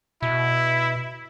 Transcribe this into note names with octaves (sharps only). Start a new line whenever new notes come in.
B2 E4